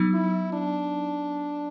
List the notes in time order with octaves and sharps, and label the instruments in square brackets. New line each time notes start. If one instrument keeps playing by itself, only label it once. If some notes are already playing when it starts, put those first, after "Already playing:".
Already playing: [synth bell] F#3 B3 D#4
[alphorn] E4
D4